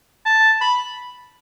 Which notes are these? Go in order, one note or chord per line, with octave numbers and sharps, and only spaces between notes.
A5
B5